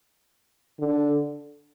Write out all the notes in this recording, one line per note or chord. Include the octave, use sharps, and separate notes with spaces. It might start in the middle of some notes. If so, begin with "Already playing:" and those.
D3